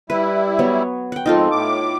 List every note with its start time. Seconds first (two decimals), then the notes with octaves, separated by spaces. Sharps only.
0.10 G3 E4 B4
0.59 F#3 B3 C#5
1.12 F#5 G5
1.26 F2 G#2 C4 D#4 F4 A4
1.51 A2 D6